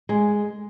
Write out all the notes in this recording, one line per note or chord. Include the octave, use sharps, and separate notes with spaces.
G#3